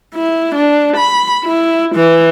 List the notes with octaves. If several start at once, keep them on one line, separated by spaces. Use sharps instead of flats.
E4
D4
B5
E4
E3